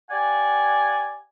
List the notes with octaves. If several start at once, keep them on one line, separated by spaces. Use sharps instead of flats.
G4 D5 F#5 G#5